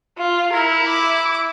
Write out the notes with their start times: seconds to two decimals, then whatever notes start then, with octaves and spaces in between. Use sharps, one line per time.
0.18 F4
0.53 E4 A#4
0.88 D6